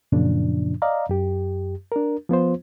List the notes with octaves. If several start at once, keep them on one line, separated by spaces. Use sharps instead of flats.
F#2 A#2 C#3 F3 D4
D5 D#5 F5 A#5
F#2 G4
D4 A#4
F3 B3 F4 C5